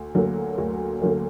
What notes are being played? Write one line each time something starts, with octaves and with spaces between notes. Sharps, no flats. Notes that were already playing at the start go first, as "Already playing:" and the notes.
Already playing: D2
D3 F#3 A#3
D2
D3 F#3 A#3